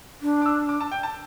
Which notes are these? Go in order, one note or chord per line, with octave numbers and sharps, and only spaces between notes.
D4
D6
E6
D6
A5
G5
A5